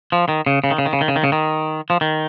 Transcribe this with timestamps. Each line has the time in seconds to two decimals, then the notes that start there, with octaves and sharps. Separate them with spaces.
0.12 F3
0.29 D#3
0.46 C#3
0.64 C#3
0.71 D#3
0.78 C#3
0.86 D#3
0.93 C#3
1.01 D#3
1.08 C#3
1.16 D#3
1.24 C#3
1.32 D#3
1.90 F3
2.01 D#3